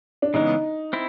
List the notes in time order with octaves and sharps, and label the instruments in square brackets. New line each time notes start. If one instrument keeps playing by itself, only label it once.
[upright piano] D4
[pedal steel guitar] C#3 E3 G#3 B3 [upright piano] D#4
[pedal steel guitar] C4 E4